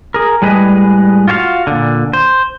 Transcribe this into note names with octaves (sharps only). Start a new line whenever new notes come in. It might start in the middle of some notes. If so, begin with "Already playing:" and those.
G#4 A#4
A2 G3 G#3 G#4 B4 D#5
F4 F#4 C#5 F5
A#2 D3
C5